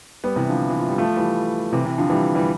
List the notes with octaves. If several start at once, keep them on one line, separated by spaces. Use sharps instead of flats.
G3 B3
C3 E3
D3 F3
E3
F3
G3
F3 A3
E3 G3
C3 E3
C3 E3
D3 F3
E3 G3
E3 G3